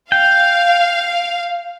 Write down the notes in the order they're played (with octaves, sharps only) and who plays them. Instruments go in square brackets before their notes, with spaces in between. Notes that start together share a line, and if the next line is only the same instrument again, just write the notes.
[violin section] F5 [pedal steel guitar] G5